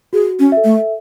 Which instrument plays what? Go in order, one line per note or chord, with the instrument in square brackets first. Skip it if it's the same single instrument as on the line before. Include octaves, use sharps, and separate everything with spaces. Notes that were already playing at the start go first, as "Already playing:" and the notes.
[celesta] F#4 [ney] G#4
[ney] C#4
[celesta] A4 E5
[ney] A3